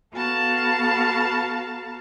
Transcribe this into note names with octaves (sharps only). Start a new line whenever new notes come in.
B3 F#4 A4 F5 A5 A#5